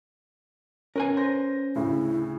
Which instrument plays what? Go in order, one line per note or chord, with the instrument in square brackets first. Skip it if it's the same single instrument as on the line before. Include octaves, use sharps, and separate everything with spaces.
[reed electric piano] C#4 [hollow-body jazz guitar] A#4 B4 G#5
[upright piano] C5 A#6
[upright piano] D2 A2 C#3 [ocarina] E4